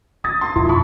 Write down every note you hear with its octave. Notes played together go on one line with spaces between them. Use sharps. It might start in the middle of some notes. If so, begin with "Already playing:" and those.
C#4 D#6 A6
C6
F2 B2 F3 E4 C6
A5 B5 C#6